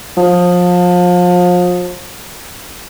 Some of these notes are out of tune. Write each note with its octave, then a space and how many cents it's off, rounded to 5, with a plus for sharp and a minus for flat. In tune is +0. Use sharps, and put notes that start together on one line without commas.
F3 +30